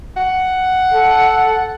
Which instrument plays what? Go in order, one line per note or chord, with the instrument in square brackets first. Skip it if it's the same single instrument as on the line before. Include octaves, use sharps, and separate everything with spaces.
[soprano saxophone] F#5
[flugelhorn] A4